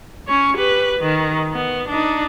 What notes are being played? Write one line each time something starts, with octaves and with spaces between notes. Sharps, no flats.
C#4 C#5
G4 B4
D#3
B3
D4 D#4